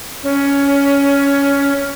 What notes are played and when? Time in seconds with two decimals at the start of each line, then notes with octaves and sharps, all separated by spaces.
0.23 C#4